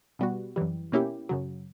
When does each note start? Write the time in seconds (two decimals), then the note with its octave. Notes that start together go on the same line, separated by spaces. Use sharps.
0.19 B2 G3 B3 F#4
0.56 F#2 E3 G3
0.92 B2 A#3 C#4 E4 G4
1.29 F#2 C#3 F#3